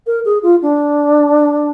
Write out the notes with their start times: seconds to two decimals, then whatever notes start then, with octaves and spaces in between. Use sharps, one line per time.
0.07 A#4
0.25 G#4
0.43 F4
0.62 D4